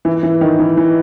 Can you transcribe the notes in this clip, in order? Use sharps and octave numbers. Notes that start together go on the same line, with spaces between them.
E3
E3
D#3
E3
E3